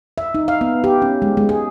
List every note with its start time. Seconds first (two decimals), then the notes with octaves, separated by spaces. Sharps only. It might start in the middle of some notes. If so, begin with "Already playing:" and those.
0.18 E5
0.35 D#4
0.48 F5
0.61 B3
0.84 G4
1.02 C#4
1.22 G#3
1.37 G#3
1.49 G#4